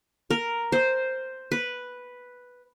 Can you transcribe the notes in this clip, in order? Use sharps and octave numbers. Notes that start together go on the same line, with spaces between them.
A#4
C5
B4